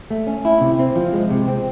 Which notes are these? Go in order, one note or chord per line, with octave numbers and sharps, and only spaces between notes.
A3
C#4
E4
C3
C4
F3
G#3
C3
C4